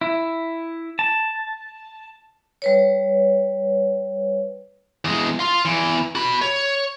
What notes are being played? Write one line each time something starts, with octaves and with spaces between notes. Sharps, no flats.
E4
A5
G3 B4 C#5
E2 G#3
F5 C6
E2 E3
F#4 B5
C#5